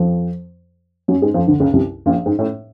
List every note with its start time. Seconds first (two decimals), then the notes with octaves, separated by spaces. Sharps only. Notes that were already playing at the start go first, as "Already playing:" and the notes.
Already playing: F2 F3
1.08 F#2 F#3
1.22 G#2 G#3
1.34 F2 F3
1.47 D2 D3
1.60 C#2 C#3
1.73 C2 C3
2.06 A#1 A#2
2.26 G#2
2.39 A2